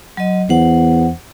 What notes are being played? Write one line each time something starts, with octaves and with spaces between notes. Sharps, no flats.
F#3 D#5
E2 C5 F#5